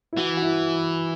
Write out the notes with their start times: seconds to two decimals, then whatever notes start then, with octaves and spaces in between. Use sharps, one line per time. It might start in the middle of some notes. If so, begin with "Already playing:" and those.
0.13 E4
0.18 E3 F#4
0.37 F#4
0.42 E4